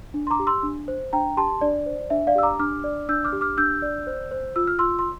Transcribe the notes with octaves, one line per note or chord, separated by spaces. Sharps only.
D4
C6
A#5 D6
G4
C6 E6
D4
C5
D4 G5 A#5
G4 A5 C6
D4 D5
C5
D4 E5
D5 F5
G4 E6
A#5 D6
D4 D6 F6
D5
D4 E6 G6
D6 F6
G4
D6 F6
D4 E6 G6
D5
C5
C5
F4 E6
F6
F4 C6 E6
C6